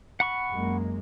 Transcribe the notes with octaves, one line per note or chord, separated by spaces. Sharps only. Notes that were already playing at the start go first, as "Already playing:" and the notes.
F#5 B5 C#6
F#2 G#3 A#3